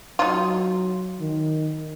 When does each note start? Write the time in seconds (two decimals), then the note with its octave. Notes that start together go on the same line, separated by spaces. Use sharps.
0.19 F#3 D#4 F4
1.20 D#3